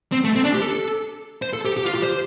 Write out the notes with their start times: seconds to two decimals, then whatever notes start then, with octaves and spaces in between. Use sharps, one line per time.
0.12 C4
0.24 A3
0.35 C4
0.44 D4
0.54 G4
0.62 A4
1.42 C5
1.53 A4
1.65 G4
1.77 G4
1.86 F4
1.95 G4
2.03 C5